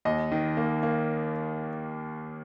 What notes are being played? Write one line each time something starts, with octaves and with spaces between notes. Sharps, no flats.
D#2 D#5
D#3
A#3
A#3